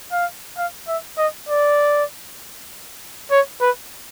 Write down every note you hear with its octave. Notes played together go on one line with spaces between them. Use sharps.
F5
F5
E5
D#5
D5
C#5
B4